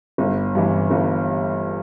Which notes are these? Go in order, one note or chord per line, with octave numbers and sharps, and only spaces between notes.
G1
G2 E3
G1